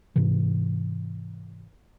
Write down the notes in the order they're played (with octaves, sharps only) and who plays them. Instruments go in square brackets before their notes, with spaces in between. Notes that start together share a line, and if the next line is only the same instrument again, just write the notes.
[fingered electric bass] G#2 C3 E3